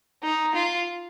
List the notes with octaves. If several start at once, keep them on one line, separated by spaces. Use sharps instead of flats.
D#4
F4